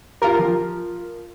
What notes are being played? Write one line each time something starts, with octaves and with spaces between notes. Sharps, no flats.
F4 G4 A#4
F3